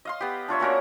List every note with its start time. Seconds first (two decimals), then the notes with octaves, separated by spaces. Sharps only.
0.05 D#5 F5 C6
0.20 B3 G4
0.48 D4 F4 C#5 E5
0.60 A#3 C#4 F#4 A#4